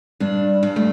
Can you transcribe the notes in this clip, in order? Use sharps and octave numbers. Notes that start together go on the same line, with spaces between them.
G2 D4
G2
A3